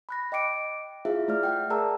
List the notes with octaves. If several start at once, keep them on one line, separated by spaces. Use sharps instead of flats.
B5 F#6 A#6
D#5 G5 D6 C#7 D7
E4 F4 G#4 C5 E5 F5
A3 D5 F6
E5 F#5 G5
G#4 A#4 D5 A5 A#5 E6